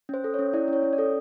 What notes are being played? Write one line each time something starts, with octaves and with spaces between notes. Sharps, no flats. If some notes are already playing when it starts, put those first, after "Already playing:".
C#4 C5
A4
C#4 C#5
E4 D5
C#4 C#5
C#4
D5
A4